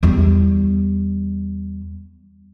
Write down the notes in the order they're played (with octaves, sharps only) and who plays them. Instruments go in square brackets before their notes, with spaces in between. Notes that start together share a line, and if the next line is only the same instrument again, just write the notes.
[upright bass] E2 G3